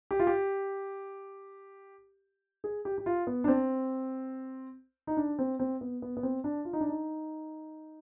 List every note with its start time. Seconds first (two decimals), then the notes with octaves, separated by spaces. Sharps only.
0.11 G4
0.19 F4
0.27 G4
2.64 G#4
2.85 G4
2.98 G4
3.06 F4
3.27 B3
3.44 D4
3.48 C4
5.07 D#4
5.17 D4
5.39 C4
5.59 C4
5.81 B3
6.02 B3
6.17 B3
6.23 C4
6.44 D4
6.65 F4
6.73 D#4
6.81 D4
6.89 D#4